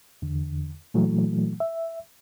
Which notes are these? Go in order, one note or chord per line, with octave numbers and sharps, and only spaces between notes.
E2 D3
A#2 E3 F#3 A3
E5